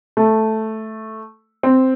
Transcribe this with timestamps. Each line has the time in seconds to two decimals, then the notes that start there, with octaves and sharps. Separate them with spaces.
0.17 A3
1.63 C4